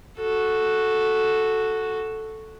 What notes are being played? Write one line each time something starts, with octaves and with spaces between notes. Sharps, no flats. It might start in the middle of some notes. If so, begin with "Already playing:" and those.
F#4 A4